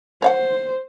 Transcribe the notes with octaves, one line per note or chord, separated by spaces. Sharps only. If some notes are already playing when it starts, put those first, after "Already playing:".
C5 C#5 F5 F#5